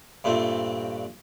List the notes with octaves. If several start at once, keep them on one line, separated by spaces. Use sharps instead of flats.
G2 A#2 A3 C4